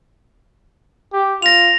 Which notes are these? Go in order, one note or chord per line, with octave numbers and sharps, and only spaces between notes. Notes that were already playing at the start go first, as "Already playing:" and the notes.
G4
F4 A#6 F7